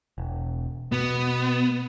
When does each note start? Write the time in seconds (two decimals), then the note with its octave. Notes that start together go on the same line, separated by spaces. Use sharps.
0.18 E1
0.92 B2 B3